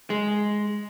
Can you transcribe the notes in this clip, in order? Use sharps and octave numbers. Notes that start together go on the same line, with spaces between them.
G#3